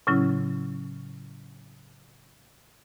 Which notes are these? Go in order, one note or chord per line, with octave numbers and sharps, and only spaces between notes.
A2 C#3 F#3 C#4 E4